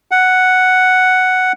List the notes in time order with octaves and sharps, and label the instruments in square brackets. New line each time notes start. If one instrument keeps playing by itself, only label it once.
[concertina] F#5